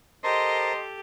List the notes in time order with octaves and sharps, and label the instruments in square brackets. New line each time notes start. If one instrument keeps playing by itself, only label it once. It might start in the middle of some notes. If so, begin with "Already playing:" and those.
[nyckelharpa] G4 A4 [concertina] A#4 C5 A5 [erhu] D#5 [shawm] C6